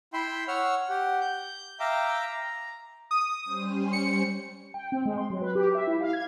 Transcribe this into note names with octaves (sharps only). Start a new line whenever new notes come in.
E4 E5 G5 B5 C6
C#5 F#5 E6 F6
G4 F#5
G6
E5 F5 G5 A#5 D6
A#5
D#6
G3 C#4 C5
C#7
G5
C4
G#3
C6
F#3
B4
G4
E5
E4
F5
G#6